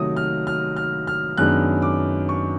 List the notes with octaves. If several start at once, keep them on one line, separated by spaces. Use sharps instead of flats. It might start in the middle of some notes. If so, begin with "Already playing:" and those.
Already playing: C3 D#3 F#3 A3 D#6
F6
F6
F6
F6
F#2 D#3 G#3 B3 D4 F#6
D6
C#6